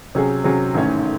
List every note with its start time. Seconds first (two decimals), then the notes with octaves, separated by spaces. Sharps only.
0.15 C3 F#3 C#4 G#4
0.44 C3 F#3 C#4 G#4
0.74 A1 G#2 D#3 A3 C#4